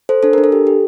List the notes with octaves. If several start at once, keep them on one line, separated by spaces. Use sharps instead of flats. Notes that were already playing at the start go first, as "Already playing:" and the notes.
A4 C5
D4 A4
D4 A#4
A4
G4
G4